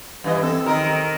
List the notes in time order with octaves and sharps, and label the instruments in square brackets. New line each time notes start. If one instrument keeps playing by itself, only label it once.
[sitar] G2 E3 D#5
[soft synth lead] C4 [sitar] A4
[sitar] D#3 D#4 A#4